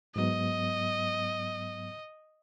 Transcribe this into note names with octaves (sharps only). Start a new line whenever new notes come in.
G#2 F#3 B3 D#5